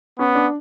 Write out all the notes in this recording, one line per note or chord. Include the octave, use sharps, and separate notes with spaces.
B3 C#4
D4